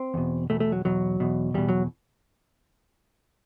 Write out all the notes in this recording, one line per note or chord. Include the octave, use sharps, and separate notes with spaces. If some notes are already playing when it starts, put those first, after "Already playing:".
Already playing: C4
E2 B2
E2 B2 A3
A3
F#3
E2 B2 F#3
E2 B2
E2 B2 G3
F#3